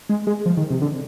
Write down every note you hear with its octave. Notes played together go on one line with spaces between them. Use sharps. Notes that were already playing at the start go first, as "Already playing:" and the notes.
G#3
G#3
F3
D#3
C3
D3